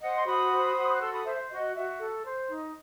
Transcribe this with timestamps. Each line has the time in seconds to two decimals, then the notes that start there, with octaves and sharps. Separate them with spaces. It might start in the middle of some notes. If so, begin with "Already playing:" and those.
0.01 C5 D#5 F#5
0.15 C6
0.26 F#4 B5 D#6
0.52 C5
0.76 F#4
0.94 F#6
1.01 A4 C6 E6
1.13 B5 D#6
1.25 C5 E5
1.50 F#4 D#5
1.75 F#4 E5
2.00 A4
2.25 C5
2.49 D#4